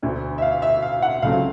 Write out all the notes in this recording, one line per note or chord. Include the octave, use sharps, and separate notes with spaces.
E1 D2 D3
E5
F5
E5
F5
F#5
C#2 C#3 F#3 A3 C4 F5